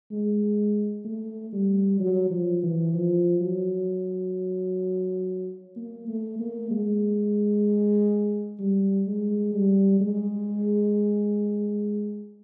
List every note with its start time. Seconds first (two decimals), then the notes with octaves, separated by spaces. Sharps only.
0.12 G#3
1.05 A3
1.53 G3
1.99 F#3
2.30 F3
2.63 E3
2.93 F3
3.41 F#3
5.76 A#3
6.08 A3
6.39 A#3
6.71 G#3
8.60 G3
9.07 G#3
9.54 G3
10.01 G#3